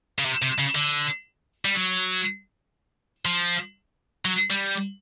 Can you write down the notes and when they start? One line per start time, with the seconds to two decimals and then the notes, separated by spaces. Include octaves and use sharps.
0.18 C#3
0.25 C3
0.42 C3
0.59 C#3
0.75 D3
1.65 G3
1.75 F#3
3.25 F3
4.25 F#3
4.50 G3